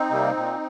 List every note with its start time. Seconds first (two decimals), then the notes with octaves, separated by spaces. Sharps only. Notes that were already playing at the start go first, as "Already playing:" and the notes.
Already playing: C4 D#4
0.11 C3 G3 A#3
0.36 A#2